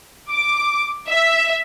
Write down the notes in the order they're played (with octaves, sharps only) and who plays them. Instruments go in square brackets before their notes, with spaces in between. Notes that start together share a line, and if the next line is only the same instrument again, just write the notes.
[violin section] D6
E5